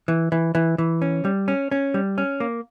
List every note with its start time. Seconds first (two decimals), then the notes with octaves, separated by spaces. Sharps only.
0.08 E3
0.32 E3
0.55 E3
0.78 E3
1.02 C#4
1.25 G3
1.48 C#4
1.71 C#4
1.94 G3
2.18 C#4
2.40 A#3